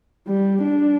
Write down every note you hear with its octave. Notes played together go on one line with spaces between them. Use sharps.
G3
D4